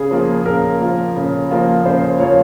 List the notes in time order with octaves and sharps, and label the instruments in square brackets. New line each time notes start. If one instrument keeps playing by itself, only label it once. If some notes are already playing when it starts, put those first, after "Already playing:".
Already playing: [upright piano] C#3 [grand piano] G#4
[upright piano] F3 A#3 F4
[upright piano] C#3 [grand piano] A#4
[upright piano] F3 A#3 F4
C#3
F3 A#3 F4
[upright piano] C#3 [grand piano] C5
[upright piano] F3 A#3 F4 [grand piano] C#5